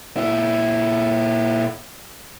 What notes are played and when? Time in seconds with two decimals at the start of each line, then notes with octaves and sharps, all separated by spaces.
0.17 A#2 E4